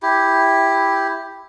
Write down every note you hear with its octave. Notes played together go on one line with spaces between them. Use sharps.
E4 G4